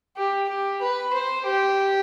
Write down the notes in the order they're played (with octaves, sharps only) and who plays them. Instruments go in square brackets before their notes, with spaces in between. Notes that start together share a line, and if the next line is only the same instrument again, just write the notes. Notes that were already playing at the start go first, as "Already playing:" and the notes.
[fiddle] G4
G4
B4
C5
G4